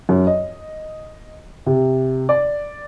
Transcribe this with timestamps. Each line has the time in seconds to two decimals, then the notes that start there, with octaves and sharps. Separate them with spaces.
0.09 F#2
0.27 D#5
1.66 C3
2.29 D5